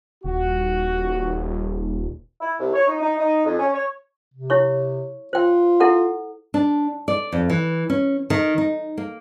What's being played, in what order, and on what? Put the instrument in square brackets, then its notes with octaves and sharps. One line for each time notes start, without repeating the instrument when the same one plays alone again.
[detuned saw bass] D#1 [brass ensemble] F#4
[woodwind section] E4
C2
C#5
D#4
D#4
D#4
F2
C#4
C#5
[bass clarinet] C3
[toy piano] E4 C#5 C#6
[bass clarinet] F4 [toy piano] C5 G5
[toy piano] E4 A4 F#5
[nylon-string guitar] D4
D5
F2
E3
C#4
D#3
D#4
A#3